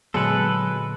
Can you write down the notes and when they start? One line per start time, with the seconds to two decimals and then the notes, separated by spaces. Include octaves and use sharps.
0.14 A#2 D3 F#3 G#3 B3 A4 B4 C#7